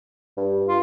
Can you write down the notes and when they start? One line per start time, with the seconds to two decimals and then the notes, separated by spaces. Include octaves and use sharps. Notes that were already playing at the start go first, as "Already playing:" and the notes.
0.37 G2
0.68 F4